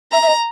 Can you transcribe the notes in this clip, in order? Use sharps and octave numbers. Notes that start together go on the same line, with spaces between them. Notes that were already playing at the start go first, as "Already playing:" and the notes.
E5 A#5
E5
D#5